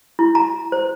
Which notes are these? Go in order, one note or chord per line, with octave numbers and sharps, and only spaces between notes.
E4
A#5
C5